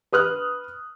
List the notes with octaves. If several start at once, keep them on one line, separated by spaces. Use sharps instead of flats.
B4 D#6 F6 F#6